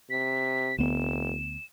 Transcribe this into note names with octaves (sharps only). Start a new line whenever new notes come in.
C3 B6
F1 D2 B3 E7